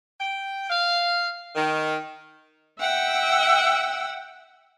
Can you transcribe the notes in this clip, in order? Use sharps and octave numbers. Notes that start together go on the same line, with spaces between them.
G5
F5
D#3
E5 F#5 G5